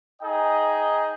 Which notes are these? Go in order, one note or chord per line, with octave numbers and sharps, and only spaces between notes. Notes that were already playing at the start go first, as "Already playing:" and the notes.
D#4 G#4 D#5 G5